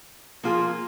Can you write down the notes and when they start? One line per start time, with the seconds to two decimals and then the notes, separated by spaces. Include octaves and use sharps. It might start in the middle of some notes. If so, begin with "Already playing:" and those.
0.43 F3 A#3 F4 G#4